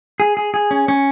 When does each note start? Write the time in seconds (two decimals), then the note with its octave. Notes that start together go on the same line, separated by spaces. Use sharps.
0.20 G#4
0.37 G#4
0.54 G#4
0.71 C#4
0.88 C#4